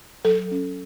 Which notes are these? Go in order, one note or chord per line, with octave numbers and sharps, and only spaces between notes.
F#3 A4
C#4